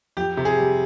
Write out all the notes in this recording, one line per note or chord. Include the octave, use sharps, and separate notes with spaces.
F2 G4
C3
G#4
G3